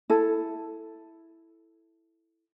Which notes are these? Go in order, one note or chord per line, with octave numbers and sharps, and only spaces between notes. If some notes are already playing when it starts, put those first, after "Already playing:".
E4 A4